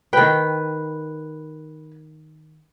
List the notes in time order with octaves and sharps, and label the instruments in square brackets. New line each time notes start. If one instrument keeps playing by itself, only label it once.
[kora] D#3 G5 [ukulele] B4